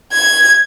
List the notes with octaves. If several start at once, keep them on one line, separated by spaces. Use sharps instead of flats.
G#6